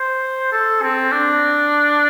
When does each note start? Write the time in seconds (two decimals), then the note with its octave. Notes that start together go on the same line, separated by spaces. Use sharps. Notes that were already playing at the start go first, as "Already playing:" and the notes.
Already playing: C5
0.52 A4
0.82 C4
1.12 D4